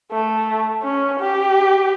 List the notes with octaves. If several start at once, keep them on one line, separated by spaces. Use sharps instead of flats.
A3
C#4
G4